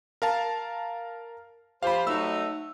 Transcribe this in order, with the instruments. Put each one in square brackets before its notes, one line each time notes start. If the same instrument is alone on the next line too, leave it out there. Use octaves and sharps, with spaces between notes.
[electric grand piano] A#4 F5 A5
[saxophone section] F3 G4 C5 [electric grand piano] F5 B5
[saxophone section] F#3 A3 D#4 [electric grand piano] E6